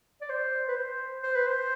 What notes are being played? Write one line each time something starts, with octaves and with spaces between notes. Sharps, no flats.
D5
C5
B4
C5
C5
B4
C5